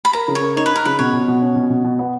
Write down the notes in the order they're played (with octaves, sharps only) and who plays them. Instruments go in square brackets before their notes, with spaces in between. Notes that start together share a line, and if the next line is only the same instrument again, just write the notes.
[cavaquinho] B5
[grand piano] A#4 [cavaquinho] A#5
[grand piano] C#3
[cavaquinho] C#5
[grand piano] A#4
[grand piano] D#4 [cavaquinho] C#5
[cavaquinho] B4
[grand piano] D#4 [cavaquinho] A#4
[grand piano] C#3 [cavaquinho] B4
[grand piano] B2 [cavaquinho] C#5
[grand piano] B2
B2
C#4
B2
B2
B2
B3